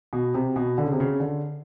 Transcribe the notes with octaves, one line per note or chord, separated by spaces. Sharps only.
B2
C3
B2
D3
C#3
C3
C#3
D3